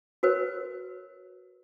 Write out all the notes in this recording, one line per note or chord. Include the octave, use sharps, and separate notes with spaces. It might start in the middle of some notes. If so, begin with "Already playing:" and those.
F#4 A#4 B4 C#5